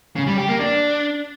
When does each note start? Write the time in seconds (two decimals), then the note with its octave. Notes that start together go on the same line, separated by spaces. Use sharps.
0.16 C#3
0.27 G3
0.38 G4
0.49 A#3
0.59 D4